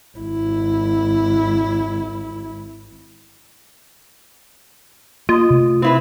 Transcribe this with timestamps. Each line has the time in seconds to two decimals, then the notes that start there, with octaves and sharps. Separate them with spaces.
0.17 G#1 E4
5.29 A#3 F4 D#5
5.50 C3 A3
5.82 C4 E4 B4